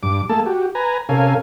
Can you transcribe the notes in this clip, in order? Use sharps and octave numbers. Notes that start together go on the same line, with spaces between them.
G2 D6
A3 A#3 G#4 A4 A5
F#4 G4
B4 G#5 A#5
C3 C#4 A4 A#4 F5 G#5